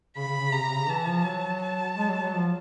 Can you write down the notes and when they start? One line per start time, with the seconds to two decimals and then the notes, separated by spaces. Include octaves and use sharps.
0.17 C#3 B5
0.28 C#3
0.41 C#3
0.52 C3 A#5
0.64 C3
0.77 C#3
0.89 E3 A5
1.08 F3
1.25 F#3
1.62 A5
1.97 G#3
2.10 F#3
2.21 F#3
2.34 F3